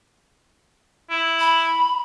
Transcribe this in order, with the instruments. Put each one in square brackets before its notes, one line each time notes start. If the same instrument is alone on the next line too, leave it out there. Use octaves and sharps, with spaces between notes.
[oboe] E4
[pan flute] B5